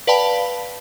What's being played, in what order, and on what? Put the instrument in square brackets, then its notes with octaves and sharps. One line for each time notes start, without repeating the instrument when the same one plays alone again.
[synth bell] B4 D5 F5 G5 A5 B5